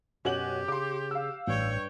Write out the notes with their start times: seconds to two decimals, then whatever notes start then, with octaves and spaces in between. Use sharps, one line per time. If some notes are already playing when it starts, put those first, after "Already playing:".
0.25 F#2 B2 C#4 F#4 G4 F#7
0.68 C#3 C6 D6
1.11 F5 E6
1.47 A1 G2 C#5 G5